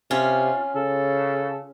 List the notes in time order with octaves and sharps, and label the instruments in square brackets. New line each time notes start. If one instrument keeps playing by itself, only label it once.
[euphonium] C3 [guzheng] C#4 F4
[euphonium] C#3 [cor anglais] A4